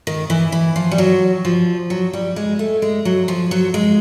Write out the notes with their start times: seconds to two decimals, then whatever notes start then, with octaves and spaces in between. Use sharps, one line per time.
0.07 D#3
0.30 E3
0.52 E3
0.76 F3
0.91 G3
0.98 F#3
1.45 F3
1.90 F#3
2.13 G3
2.36 G#3
2.59 A3
2.82 G#3
3.05 F#3
3.28 F3
3.51 F#3
3.74 G#3